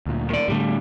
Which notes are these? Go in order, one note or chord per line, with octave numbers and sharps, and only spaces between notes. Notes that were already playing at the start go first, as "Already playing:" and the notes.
D2 A#2
D#3 D5
A2 D3 G3 A3